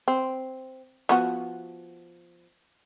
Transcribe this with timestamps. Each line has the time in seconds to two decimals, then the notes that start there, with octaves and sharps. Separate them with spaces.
0.08 C4
1.09 F3 B3 F#4